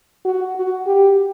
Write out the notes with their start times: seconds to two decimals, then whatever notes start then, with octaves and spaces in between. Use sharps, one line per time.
0.25 F#4
0.56 F#4
0.86 G4